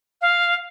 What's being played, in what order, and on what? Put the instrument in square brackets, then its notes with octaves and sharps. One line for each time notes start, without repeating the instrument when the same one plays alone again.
[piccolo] F5